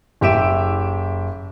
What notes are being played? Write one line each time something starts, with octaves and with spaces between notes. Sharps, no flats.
F#1 G4 E5 D7 E7